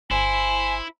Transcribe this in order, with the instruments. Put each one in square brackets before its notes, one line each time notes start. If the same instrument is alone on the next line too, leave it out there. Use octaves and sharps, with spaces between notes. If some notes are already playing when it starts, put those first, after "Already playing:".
[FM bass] G1 [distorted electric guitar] E4 [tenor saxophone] C5 [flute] G#5